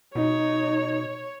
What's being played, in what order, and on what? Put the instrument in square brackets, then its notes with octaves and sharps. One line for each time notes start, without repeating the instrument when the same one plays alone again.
[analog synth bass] B2 [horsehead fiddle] D#4 [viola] C#5